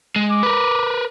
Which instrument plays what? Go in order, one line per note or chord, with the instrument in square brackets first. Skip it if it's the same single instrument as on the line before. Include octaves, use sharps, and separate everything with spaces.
[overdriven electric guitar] G#3
[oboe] D6
[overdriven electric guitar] A#4 B4